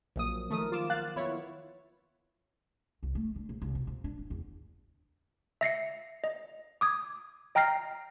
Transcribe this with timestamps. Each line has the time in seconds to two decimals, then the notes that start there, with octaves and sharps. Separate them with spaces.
0.16 A#1 F3 F#3 A#3 D#6
0.50 D#3 F3 A3 A#4 D#6
0.72 F4 D6 E7
0.90 F5 F#6 A6
1.16 B3 E4 F4 C#5
3.03 C2
3.15 A3
3.36 D3
3.49 A#1
3.62 C2
3.75 B2
3.87 F2
4.04 D4
4.19 A1
4.30 E2
5.61 E5 A#6 C7 C#7
6.24 D#5
6.81 D6 D#6 G#6
7.55 D#5 G5 A#5 F6 A#6 C7